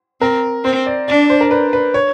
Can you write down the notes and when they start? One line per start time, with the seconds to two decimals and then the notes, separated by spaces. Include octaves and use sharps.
0.21 C4 A#4
0.64 C4 C5
0.86 D5
1.08 D4 D5
1.30 C5
1.41 A#4
1.51 B4
1.73 B4
1.94 C#5